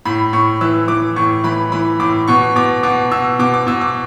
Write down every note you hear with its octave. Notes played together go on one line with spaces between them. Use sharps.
A2 B5
A2 C#6
E3 E6
E3 D6
A2 C#6
E3 B5
E3 B5
A2 D6
B2 C#6
B2 D6
B2 D6
B2 E6
B2 D6
D6
B2 E6
D6